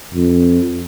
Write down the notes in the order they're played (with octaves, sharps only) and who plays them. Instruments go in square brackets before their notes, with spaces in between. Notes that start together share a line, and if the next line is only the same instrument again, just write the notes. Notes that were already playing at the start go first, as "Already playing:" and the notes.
[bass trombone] F2